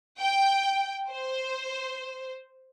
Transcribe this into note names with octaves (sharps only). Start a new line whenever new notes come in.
G5
C5